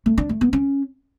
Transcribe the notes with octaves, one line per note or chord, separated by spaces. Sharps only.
A3
D4
A3
B3
C#4